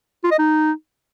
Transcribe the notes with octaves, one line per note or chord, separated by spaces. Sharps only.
F4
D#5
D#4